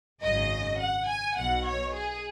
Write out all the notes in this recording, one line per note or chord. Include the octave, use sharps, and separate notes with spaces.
G#1 F#2 C#3 D#5
F#5
G#5
B1 B2 F#5
C#5
G#4